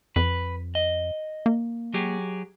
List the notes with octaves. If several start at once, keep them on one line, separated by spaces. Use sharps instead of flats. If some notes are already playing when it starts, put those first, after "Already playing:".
F2 B4
D#5
A#3
F#3 G4 G#4